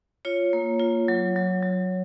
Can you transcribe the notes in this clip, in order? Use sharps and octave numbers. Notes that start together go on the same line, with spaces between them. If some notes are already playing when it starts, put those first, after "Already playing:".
F4 C#5
A#3
F4
F#3
F#3
F#3